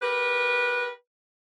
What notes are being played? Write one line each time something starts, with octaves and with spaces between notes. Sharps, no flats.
G4 A#4 B4